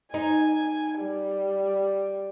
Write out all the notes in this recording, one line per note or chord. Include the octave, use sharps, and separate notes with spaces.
D#4 G#5
G3